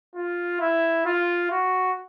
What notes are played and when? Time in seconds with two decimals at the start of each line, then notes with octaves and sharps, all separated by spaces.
0.15 F4
0.60 E4
1.06 F4
1.51 F#4